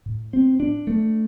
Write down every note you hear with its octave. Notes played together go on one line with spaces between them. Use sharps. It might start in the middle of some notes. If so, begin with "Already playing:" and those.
A2
C4
D4
A3